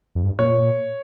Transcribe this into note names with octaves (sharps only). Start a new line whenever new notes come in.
F2
G2
A#2 C#5